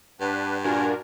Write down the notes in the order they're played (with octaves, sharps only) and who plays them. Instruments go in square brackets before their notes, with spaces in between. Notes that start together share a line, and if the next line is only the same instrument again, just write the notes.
[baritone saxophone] G2 [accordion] D4 B4 [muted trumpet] F#5
[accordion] A#2 F4 [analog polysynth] D4 F#4 A#4 [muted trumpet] G#5